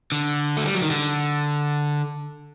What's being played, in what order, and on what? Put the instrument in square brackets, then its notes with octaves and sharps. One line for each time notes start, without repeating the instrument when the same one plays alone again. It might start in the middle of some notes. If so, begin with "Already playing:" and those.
[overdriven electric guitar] D3
A3
G3
F#3
D#3
D3